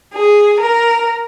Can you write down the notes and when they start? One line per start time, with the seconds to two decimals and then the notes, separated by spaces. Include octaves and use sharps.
0.13 G#4
0.62 A#4